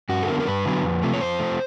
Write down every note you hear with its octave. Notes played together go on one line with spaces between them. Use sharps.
G2 F#4
A4
D3 F#3 B3 A#4
A#4
G2 B4
D3 F#3 B3
F2
C3 F3 A3
C#5
F2 C5
C3 F3 A3